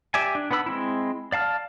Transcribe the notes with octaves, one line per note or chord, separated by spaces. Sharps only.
G4 D5 E5 G#5
D4
B3 D4 B4 B5 E6
G#3 C4 E4
D5 F5 A5 F6